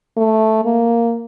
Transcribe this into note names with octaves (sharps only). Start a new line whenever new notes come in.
A3
A#3